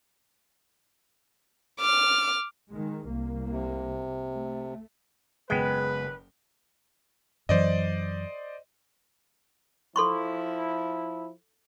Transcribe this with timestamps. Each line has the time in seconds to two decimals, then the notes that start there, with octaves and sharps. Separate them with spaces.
1.80 D6 F6
2.70 D#3 G#3
3.06 C2 A#3
3.49 C3
4.36 A3
5.50 F#1 G#3 B3 B4 G5
7.49 F#2 E3 F#3 C5 D5 D#5
9.96 F3 E4 A4 C6 C#6